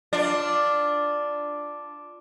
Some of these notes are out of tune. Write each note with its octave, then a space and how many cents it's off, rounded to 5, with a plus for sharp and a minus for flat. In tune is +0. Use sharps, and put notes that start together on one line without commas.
D4 +0 F4 +0